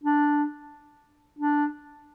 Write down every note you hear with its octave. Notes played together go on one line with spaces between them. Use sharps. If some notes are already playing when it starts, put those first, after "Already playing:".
D4
D4